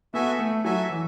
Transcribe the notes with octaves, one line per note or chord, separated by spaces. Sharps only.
B3 F#4 A4 E5 G#5
A3
F#3 F#4 A4 E5 G#5
E3